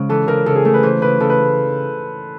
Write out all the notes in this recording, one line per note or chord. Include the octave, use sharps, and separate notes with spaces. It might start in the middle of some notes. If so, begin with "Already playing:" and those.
Already playing: C#3 G#3 C#4
E3 A4
C#3 A#4
C#3 A4
G#4
A3 A4
B4
E3 C5
C#3 B4
C#3 A4
B4